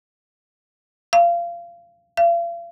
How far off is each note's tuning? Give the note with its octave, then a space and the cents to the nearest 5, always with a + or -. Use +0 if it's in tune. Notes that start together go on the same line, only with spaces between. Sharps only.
F5 -25
F5 -40